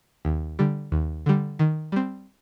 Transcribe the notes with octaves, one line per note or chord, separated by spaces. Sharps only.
D#2
D3 G3
D#2
D3 G3
D#3
G3 C4